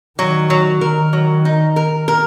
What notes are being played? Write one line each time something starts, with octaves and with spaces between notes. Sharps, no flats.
D#3 F#3
F#3
D#3 A#4
F#3
D#4
A#4
A#4